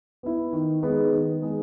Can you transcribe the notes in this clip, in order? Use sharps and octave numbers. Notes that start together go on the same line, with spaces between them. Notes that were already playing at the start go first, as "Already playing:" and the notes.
B3 E4
D#3
G#3 B3 D#4 G#4
D#3
G#3 B3 D#4 G#4